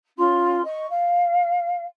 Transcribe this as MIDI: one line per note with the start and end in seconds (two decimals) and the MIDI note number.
0.17 0.62 61
0.17 0.62 65
0.17 0.62 84
0.64 0.85 75
0.64 0.85 85
0.89 1.83 77